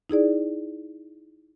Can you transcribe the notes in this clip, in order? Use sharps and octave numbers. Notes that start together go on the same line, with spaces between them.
D#4 E4 G#4 D5